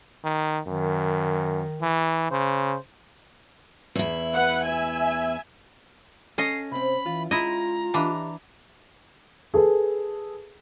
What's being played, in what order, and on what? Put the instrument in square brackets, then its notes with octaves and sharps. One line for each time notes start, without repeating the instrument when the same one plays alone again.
[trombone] D#3
[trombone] F#2 [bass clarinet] D#3
[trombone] E3
[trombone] C#3 [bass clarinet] C5
[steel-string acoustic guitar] E2 E4
[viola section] B4 F#5
E5 G#5
[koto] C#4 D#5 [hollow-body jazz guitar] A4 F5 [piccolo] C7
[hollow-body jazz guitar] C3 C4 [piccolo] B5
[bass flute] E3 [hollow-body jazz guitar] F4
[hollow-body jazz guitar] G#3 [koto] E4 D#5 [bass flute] F4 [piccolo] A#5
[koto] E3 D4 [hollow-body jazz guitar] G4 D#5 F5
[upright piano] G#4 A4 B4